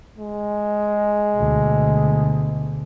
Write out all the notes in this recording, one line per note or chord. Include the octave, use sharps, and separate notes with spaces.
G#3
D2 B2